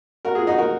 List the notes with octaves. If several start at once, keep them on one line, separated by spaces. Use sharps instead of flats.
F#4 A#4
F4 G#4
D#4 F#4
F#4 A#4